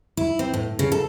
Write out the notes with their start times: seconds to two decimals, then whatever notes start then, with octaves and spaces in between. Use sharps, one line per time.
0.17 E4
0.39 C4
0.54 A2
0.79 C#3
0.92 A4